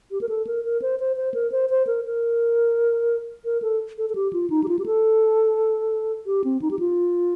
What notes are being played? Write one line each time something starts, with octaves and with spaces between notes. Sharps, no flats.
G4
A#4
A4
A#4
A#4
C5
C5
C5
A#4
C5
C5
A#4
A#4
A#4
A4
A4
A4
G4
F4
D#4
G4
F4
G4
A4
G4
C4
D#4
G4
F4